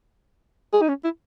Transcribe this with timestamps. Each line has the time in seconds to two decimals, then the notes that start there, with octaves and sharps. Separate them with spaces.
0.73 G#4
0.82 D#4
0.89 C#4
1.04 E4